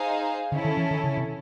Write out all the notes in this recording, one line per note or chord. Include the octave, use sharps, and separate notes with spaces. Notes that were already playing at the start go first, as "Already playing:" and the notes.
Already playing: D#4 G#4 C5 F5
D3 C#4 E4 A4
D#3
E3
D#3
C#3
C3